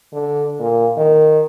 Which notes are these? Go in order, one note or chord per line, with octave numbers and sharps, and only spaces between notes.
D3
A#2
D#3